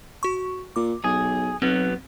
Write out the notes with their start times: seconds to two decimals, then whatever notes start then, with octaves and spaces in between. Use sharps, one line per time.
0.23 F#4 C#6
0.76 A#2 D6
1.04 B1 G#4
1.62 B1 F#3 B3 C4